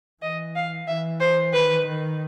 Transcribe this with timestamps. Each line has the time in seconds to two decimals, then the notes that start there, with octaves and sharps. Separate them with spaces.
0.22 E3 D#5
0.56 F5
0.88 E3 E5
1.20 C5
1.53 D#3 B4
1.86 D#3